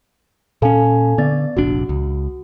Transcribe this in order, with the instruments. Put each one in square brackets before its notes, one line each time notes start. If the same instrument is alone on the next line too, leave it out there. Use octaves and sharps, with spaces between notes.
[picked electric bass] A#2 C#4 [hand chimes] A4 F5 G#5
[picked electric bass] D3 [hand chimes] B3 D5 A6
[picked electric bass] F1 A#1 D4 [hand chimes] F#4
[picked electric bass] C#2